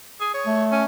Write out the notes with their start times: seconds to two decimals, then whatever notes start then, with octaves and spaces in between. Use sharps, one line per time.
0.21 G#4
0.34 C#5
0.46 A3
0.71 C#4